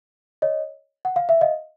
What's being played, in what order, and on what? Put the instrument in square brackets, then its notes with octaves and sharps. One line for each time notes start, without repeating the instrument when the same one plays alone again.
[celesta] C#5 D#5
F#5
F5
E5
D#5 F5